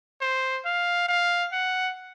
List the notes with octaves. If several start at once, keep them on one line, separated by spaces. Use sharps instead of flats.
C5
F5
F5
F#5